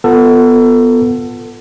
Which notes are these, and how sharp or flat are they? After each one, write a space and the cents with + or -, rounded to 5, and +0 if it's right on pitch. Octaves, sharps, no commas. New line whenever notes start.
B3 +0 F4 +0 A4 +20